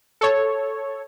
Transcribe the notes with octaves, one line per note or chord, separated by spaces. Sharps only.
A4 C#5